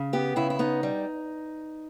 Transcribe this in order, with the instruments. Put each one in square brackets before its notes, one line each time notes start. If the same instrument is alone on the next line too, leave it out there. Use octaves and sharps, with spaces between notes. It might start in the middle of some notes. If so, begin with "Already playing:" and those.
Already playing: [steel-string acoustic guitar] C#3
B3 G4
C#3 E4
E4
B3 D#4
G3